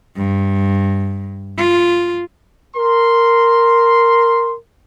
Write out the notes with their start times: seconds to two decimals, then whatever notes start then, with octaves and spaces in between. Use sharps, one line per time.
0.16 G2
1.58 F4
2.76 A#4 C6